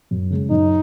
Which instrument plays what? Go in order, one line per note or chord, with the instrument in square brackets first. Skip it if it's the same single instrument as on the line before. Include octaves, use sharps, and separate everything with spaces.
[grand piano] F#2
C#3 G#3
[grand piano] F#2 [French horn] D#4